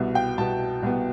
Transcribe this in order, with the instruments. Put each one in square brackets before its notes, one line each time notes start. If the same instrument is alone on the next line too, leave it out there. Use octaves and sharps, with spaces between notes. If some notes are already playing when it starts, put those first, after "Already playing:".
Already playing: [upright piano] C2 B2 B3 E5
G5
C2 B2 B3 A5
C2 B2 B3